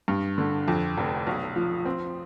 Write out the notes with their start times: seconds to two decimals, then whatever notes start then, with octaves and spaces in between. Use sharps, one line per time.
0.08 G2
0.38 D3
0.68 F2
0.97 F1
1.27 B1
1.56 F3
1.85 C4